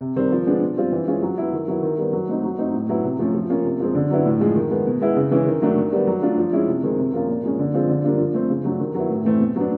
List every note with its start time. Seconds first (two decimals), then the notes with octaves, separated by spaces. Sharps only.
0.01 C3
0.16 D#3 G3 C4
0.32 F3
0.46 G#3 B3 D4
0.62 B2
0.77 G3 C4 F4
0.92 E3
1.07 G#3 C#4 F4
1.22 F#3
1.38 B3 E4
1.53 D#3
1.68 F#3 B3 E4
1.82 D#3
1.98 G3 B3
2.13 F#3
2.28 A3 C4 D#4
2.43 F#3
2.59 A3 C4 D#4
2.74 A2
2.89 F#3 B3 E4
3.04 C3
3.19 F3 A3 C#4
3.34 F3
3.50 A#3 C#4 F4
3.65 C3
3.80 F3 G#3 C4
3.95 D3
4.10 F#3 B3 E4
4.26 A2
4.41 F3 G#3
4.56 D#3
4.71 G#3 B3
4.86 B2
5.01 G#3 B3 E4
5.16 C#3
5.31 E3 G#3 C#4
5.47 D#3
5.62 F#3 A3 D4
5.77 D#3
5.92 G3 B3
6.07 F#3
6.23 A3 D4 F4
6.38 F3
6.53 G#3 C#4 E4
6.68 C3
6.83 D#3 G#3 C4
6.98 C3
7.13 F3 A#3 C#4 F4
7.28 A#2
7.43 F3 G#3 C#4
7.59 D3
7.74 F3 G#3 C4 F4
7.89 D3
8.04 G3 A#3 D4 F4
8.19 F3
8.34 A3 C4
8.49 C#3
8.65 F#3 A3 D4
8.80 D#3
8.95 F#3 B3 E4
9.10 A2
9.25 E3 A3 C4
9.40 B2
9.56 F#3 B3 D4